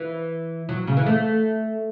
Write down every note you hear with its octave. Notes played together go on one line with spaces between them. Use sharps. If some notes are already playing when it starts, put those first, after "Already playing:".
Already playing: E3
F#3
C#3
E3
A3